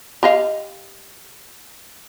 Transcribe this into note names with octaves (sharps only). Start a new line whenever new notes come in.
G4 D#5 F5